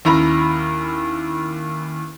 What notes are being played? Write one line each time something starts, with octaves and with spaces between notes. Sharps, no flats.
D#2 C#4 E4 A#5 B5